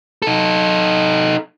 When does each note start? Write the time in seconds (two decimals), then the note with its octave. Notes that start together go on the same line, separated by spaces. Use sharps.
0.22 D#4 A4